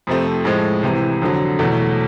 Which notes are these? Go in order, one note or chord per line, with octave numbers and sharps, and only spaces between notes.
F2 C3 F3 A3 C4
A2 F3 G#3
C2 C3 E3
F2 D3 F#3
E2 B2 F#3 A3